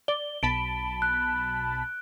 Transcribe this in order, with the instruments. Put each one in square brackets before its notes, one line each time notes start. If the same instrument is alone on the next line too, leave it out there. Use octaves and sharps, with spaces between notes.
[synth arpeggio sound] D5 [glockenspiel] G7
[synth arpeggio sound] B1 A5 B5 [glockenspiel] D7
[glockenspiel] F#6